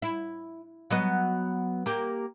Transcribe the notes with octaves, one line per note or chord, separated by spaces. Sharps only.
E4
F#3 B3 D#5
A#3 G4